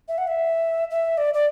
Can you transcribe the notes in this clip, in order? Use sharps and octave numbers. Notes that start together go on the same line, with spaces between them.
E5
F#5
E5
E5
D5
D5